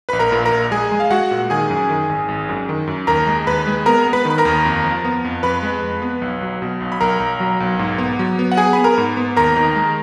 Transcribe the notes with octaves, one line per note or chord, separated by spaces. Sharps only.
B4 B5
A#1
A#4 A#5
A#2
A#4 A#5
A#1
G#3 G#4 G#5
G#3
F5
G#3 F#4 F#5
A#2
D#3 G#4 G#5
F#2
D#3
G#1
G#1
F#2
D#3
F#2
D#2 A#4 A#5
G#3
D#2 B4 B5
G#3
B3 A#4 A#5
B3
B4 B5
D#3
B5
A#4 A#5
D#2
F2
F3
B3
F2
F2 B4 B5
G#3
F2
B3
B1
F#3
B2
B1
B5
B1 A#4 A#5
B1
F#3
B1
G#2
B3
F#3
B3
F#5
B3 G#4 G#5
B5
B3
A#4 A#5
G#2
B3
D#2 A#4 A#5
D#3
G#3